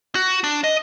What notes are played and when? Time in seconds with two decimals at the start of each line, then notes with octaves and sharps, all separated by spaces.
0.15 F#4
0.44 D4
0.64 D#5